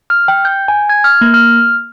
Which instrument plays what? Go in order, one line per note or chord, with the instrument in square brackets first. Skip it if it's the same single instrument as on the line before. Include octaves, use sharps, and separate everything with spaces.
[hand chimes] F6
G5
G6
G#5
G#6
F6
A#3
F6